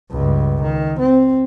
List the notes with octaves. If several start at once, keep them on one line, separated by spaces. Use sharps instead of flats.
C#2 G2
D#3
C4